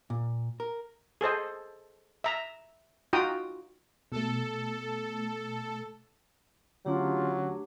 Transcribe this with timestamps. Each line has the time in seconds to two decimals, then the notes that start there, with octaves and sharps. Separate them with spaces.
0.10 A#2
0.60 A#4
1.21 G#4 A4 C5 D#5
2.24 E5 A#5
3.13 D#4 F4 F#4 G5 A#5 D#6
4.12 B2 A3 A4
6.86 D3 F#3 A3 C#4 D4 F4 G4